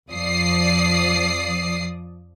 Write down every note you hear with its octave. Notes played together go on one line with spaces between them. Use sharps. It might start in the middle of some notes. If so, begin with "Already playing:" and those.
F2 F3 D5 D#6 C7